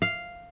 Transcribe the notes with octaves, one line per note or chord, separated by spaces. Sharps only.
F5